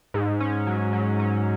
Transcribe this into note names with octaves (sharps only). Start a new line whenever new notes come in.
G#2
C#4
F#3
F#3
C#4